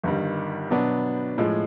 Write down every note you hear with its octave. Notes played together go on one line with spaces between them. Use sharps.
G1 G2 D#3 G3
B2 F#3 B3 D4
A2 F3 G#3